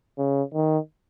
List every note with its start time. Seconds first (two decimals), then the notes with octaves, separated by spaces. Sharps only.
0.18 C#3
0.54 D#3